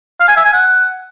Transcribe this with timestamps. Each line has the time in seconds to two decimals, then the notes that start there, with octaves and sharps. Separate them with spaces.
0.20 F5
0.28 G#5
0.37 E5
0.45 G#5
0.53 F#5